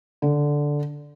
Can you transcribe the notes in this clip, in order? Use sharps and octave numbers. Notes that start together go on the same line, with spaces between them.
D3